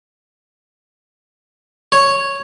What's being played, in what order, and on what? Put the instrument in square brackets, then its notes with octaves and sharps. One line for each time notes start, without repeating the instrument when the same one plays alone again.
[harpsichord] C#5